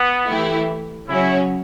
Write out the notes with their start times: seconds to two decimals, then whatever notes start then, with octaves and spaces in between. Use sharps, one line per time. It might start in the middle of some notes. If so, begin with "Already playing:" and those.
Already playing: B3
0.28 E3 A3 E4 G4
1.08 C#3 F#3 C#4 E4 F#4